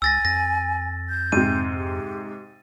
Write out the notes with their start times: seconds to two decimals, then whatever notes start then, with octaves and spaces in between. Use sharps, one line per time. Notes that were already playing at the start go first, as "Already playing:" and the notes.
0.02 C#2 G#5 E6 A6 A#6
0.25 F2 A#6
1.09 G6
1.32 G#2 C3 D#7
1.75 G4